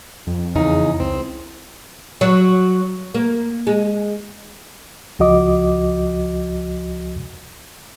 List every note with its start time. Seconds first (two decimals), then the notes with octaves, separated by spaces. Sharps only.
0.27 F2
0.55 E2 C#3 D#4
1.00 C#2 C4
2.21 F#3
3.14 A#3
3.67 G#3
5.19 C#2 F3 F#4 D#5 D6